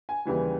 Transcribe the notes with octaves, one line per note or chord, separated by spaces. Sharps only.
G#5
D#2 C#3 E3 G3